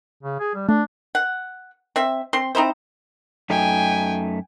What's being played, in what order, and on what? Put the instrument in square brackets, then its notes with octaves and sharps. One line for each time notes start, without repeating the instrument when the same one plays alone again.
[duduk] C#3
G#4
G3
[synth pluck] A3 [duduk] D4
[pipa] F#5
C4 E5
C4 C6
C4 D#4 E4 C5
[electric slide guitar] F#2 A3 D#4 [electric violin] G5 G#5